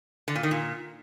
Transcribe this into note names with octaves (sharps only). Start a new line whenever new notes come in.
D3
A#2
D#3
A#2